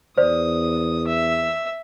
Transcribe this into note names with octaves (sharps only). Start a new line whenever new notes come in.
E2 C5 D5 D#6
E5